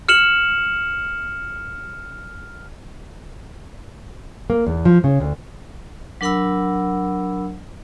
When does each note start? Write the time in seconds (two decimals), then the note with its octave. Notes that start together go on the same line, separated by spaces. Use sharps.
0.09 F6 C#7 E7 F#7
4.50 A#3
4.67 E2
4.85 F3
5.04 C#3
5.20 D2
6.21 F#3 D4 A#4 F#5 B5 E6